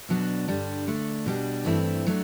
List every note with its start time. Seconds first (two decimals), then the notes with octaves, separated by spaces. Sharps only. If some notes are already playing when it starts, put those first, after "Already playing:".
0.09 B2 F#3 B3 D4
0.48 G2 D3 G3 D4
0.87 D3 A3 D4
1.26 B2 G3 D4
1.65 G2 E3 A3 C4 E4
2.07 F#3 A3 D4